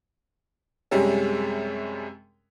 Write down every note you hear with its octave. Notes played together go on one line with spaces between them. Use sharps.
F#2 C3 G3 G#3 C#4